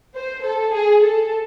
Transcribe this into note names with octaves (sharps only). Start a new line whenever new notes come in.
C5
A4
G#4
A4